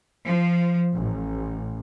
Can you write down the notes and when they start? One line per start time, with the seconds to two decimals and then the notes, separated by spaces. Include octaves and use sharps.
0.24 F3
0.95 A1